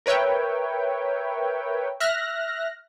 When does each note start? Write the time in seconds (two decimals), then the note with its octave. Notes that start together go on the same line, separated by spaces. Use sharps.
0.06 A#4 B4 C#5 E5 G5
2.00 E5 F6 F#6 A#6